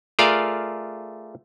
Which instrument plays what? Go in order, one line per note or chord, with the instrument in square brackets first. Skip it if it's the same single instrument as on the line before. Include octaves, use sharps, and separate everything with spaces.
[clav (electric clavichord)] A3 F4 G#4 A#4 D5 F5